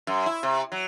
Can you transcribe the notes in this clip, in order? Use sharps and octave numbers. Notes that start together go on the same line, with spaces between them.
F#2
E4
C3
F#3